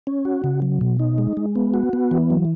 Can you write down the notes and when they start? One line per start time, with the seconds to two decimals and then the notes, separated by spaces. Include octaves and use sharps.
0.07 C#4
0.25 F#4
0.44 C#3
0.62 F#3
0.81 B2
0.99 D#4
1.18 G#3
1.37 G#3
1.56 B3
1.74 F#4
1.93 B3
2.11 E3
2.30 F#3